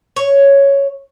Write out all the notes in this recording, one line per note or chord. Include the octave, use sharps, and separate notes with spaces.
C#5